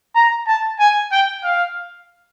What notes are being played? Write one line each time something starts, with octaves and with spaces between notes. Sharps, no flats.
A#5
A5
G#5
G5
F5